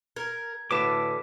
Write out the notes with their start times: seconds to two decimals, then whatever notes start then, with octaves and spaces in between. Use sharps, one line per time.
0.16 A#4 G#6
0.71 A2 D3 E3 F#4 B4 A5 D6 B6